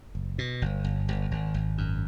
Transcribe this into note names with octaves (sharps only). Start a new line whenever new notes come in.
F#1
B2
G1
G1
G1
G#1
G#1
F#2